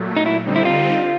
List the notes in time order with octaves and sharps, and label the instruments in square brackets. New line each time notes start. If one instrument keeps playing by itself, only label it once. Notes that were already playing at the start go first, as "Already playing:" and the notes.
Already playing: [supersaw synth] A#2 F#3 A3
[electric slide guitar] D#4
E4
[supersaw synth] D3 G3 C4 D#4
[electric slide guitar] E4
F4